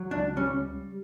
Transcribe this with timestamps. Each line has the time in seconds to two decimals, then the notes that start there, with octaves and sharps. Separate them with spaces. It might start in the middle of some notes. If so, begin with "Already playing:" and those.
Already playing: F#3
0.11 C#2 D4
0.36 G3 C#4